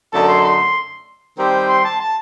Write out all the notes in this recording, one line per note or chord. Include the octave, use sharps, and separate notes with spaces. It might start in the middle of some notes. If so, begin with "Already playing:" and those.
F#2 D3 A3 D#4 A4 A5
C6
C6
D#3 G3 C4 G4 C5
C6
A5
A5